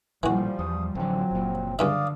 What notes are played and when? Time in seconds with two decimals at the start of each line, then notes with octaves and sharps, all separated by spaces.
0.23 A1 A#2 E3 F3 G3 F#4
0.59 E2 D#6
0.95 A1 D3 F3 F#3 C4
1.31 F#1 A#2
1.79 C#2 G2 D3 D5 E5 F5 D#6